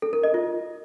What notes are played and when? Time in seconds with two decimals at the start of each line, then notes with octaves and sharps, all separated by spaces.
0.02 A4
0.13 A#4
0.24 D#5
0.34 F4